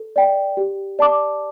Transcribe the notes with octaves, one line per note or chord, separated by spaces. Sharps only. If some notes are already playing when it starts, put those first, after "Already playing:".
Already playing: A4
D5 G5
G4
D5 A5 D6